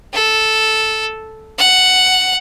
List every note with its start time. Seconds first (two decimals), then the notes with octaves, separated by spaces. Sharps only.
0.14 A4
1.59 F#5